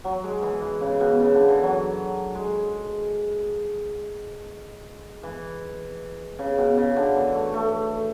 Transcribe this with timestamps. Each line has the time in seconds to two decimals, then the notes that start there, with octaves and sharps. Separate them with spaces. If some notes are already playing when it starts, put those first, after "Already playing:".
0.04 F#3
0.24 G#3
0.42 E3
0.62 E3
0.81 C#3
1.00 B2
1.20 C#3
1.34 D3
1.48 E3
1.63 F#3
2.35 G#3
5.23 E3
6.39 C#3
6.58 B2
6.77 C#3
6.96 D3
7.16 E3
7.34 A3
7.54 A3